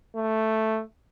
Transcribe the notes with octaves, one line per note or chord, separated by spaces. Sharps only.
A3